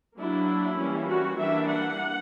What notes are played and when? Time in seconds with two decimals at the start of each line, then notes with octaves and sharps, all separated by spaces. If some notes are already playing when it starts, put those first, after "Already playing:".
0.18 F#3 A#3 D4 E4
0.79 E3 G3 A#3 C#4
1.09 F#4
1.38 E3 G3 A#3 D4 E5
1.69 F#5